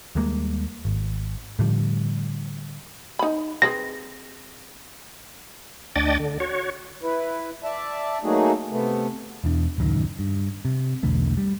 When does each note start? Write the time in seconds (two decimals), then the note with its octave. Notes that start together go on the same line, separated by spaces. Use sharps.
0.15 D#2 G3 G#3 A#3
0.85 G#1
1.59 A2 D3 F3 G3
3.19 D#4 B5
3.62 C4 G#4 B4 A#6
5.96 D2 D4 D5 D#5 G5 A6
6.19 D3
6.40 F#4 C#5
7.03 E4 B4
7.64 D5 E5 A5
8.24 F#3 A3 A#3 D#4 F#4 G#4
8.70 C3 A3 B3
9.44 E1 E2 D4
9.78 D1 C#2 F#2 D#3
10.19 G2
10.65 C3
11.03 B1 E2 D3 A3
11.37 G3